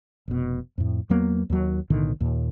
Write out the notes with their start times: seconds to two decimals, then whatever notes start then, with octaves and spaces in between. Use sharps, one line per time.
0.28 F1 B2
0.78 F2 A2
1.09 E2 F#3 A#3 B3
1.50 D#2 F#3
1.90 B1 A2 D3 D#3
2.20 D#2 A#2